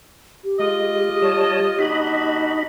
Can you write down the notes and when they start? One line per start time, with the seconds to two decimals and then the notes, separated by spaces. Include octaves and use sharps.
0.44 G4
0.59 G#3 F4 D#5
1.22 G3 C#5 A5
1.79 D#2 D4 D#4 F#4 D#5 B5